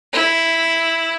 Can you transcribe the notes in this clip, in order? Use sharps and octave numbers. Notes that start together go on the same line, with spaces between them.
E4